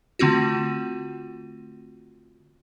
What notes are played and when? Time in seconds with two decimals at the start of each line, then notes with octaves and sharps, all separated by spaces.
0.19 D3 A3 C4 F4 F#4